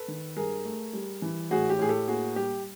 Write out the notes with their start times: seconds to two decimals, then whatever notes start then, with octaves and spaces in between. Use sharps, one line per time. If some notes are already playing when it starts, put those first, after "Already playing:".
Already playing: A4 B4
0.08 D#3
0.36 G2 G#4 A#4
0.65 A3
0.93 G3
1.22 E3
1.50 A2 F#4 G#4
1.70 G4
1.79 A2 G#4
1.89 G4 A4
2.08 A#3 F#4 G#4
2.36 G3 G4